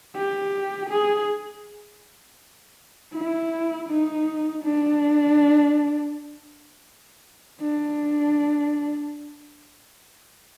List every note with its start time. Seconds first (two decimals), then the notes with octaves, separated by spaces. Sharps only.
0.16 G4
0.90 G#4
3.13 E4
3.88 D#4
4.63 D4
7.61 D4